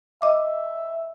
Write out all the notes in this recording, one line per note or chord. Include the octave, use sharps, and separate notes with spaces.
D#5 E5 D6